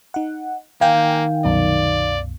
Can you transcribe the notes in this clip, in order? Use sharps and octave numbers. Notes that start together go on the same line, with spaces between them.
D#4 F#5
D#3 A#3 F5 G5 G#5
C2 F#2 B2 D5